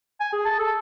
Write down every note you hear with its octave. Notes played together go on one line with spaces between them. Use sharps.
G#5
G#4
A5
A4